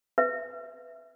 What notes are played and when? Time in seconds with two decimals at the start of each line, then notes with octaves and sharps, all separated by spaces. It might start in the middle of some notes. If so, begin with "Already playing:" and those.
0.18 B4 E5